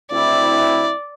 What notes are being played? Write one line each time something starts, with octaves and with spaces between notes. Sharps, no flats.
D2 C4 E4 D5